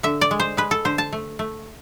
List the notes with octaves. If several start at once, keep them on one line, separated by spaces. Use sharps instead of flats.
D3 E5
D5
G#3
C5
G#3 B4
A4
D3 C5
A5
A3
A3